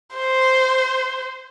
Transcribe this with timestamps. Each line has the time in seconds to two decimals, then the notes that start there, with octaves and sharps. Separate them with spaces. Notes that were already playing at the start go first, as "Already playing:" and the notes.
0.15 C5